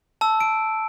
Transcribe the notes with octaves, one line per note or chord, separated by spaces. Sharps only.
A5 E6
D7